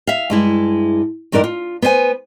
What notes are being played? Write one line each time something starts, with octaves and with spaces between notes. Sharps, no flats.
E5 F5
G2 G#3 E4
E2 G2 D#4 A#4 D5
F4
B3 C5 D5 G#5